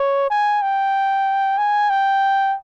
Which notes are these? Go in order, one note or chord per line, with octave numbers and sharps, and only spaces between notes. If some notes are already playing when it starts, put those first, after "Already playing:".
Already playing: C#5
G#5
G5
G#5
G5